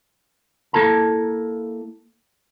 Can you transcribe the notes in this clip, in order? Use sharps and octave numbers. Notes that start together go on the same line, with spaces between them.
A#3 E4 A4 A5 A#5